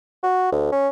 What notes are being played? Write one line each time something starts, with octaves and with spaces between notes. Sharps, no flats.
F#4
D2
C#4